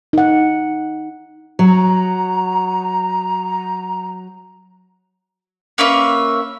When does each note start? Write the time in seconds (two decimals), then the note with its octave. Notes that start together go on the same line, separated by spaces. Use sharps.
0.13 D#4 F#5
1.59 F#3 A#5
5.78 A#3 C#4 B4 E5